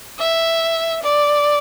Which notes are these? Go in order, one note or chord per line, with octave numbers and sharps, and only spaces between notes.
E5
D5